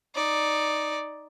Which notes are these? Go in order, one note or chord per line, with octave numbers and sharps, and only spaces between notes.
D#4 D5